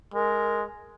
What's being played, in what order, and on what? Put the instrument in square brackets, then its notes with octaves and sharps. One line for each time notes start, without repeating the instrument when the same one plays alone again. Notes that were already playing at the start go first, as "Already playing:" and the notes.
[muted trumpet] G#3 [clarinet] A#4